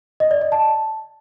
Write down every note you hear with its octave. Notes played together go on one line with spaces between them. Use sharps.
D#5
D5
D#5
A5